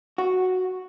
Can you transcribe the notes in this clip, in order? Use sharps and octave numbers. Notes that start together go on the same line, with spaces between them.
F#4